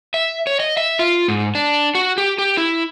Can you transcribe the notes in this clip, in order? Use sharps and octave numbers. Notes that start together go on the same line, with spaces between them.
E5
C#5
D#5
E5
F4
G#2
D4
F#4
G4
G4
E4